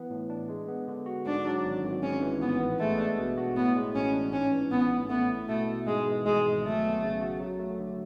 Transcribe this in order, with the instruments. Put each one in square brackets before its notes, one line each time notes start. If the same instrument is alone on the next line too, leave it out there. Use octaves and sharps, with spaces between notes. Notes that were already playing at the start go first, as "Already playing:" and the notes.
Already playing: [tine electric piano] E3 B3
A2
D4
G#3
B3
D3
F#4
[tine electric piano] G#2 [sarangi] D4
[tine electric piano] F#3
G#1
G#1
[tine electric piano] G#2 [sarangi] C#4
[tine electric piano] E3
[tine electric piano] A1 [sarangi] B3
[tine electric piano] B3
[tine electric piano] G#3 [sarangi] A3
[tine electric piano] D4
B2
F#4
[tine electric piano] A2 [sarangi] B3
[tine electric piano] G#3
[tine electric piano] A1 [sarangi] C#4
[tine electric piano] D4
[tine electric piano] G#2 [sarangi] C#4
[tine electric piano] E3
[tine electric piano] A1 [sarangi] B3
[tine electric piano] A1
[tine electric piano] A3 [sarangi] B3
[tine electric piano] E4
[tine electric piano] B2 [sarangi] A3
[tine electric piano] B2
[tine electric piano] G#2 [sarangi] G#3
[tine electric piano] E3
[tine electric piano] G#1 [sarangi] G#3
[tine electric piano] G#1
[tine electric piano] F#3 [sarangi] A3
[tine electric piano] B3
C#3
F#4
F#3
A3
D3